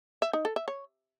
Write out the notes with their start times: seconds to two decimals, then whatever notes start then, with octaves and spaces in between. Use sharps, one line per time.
0.22 E5
0.33 D#4
0.45 A4
0.56 E5
0.68 C#5